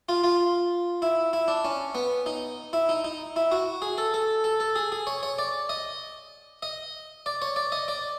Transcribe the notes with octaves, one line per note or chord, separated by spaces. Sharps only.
F4
F4
E4
E4
D4
C#4
B3
D#4
E4
D#4
D#4
E4
F#4
G#4
A4
A4
A4
A4
G#4
G#4
C#5
C#5
D5
D#5
D#5
D5
C#5
D5
D#5
D5